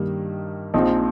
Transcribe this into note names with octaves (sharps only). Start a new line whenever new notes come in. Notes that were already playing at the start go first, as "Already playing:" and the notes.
Already playing: G2 D#3 G3 A#3 D#4
A#1 A#2 F3 C4 D#4